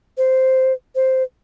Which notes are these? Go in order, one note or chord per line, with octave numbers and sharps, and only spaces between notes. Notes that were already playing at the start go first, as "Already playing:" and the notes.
C5
C5